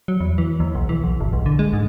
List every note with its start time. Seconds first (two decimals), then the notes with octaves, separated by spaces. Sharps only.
0.08 F#3
0.20 E2
0.38 E3
0.60 D#2
0.75 B1
0.89 E3
1.04 B1
1.21 G#1
1.33 B1
1.46 D3
1.59 G#3
1.73 G#2